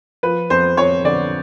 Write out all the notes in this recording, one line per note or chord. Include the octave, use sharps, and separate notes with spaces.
F3 B4
F2 C5
F2 C#5
D3 D5